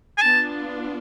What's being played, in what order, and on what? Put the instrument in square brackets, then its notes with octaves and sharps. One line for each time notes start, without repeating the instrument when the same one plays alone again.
[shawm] G#5
[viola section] B3 D4 F4 [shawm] A5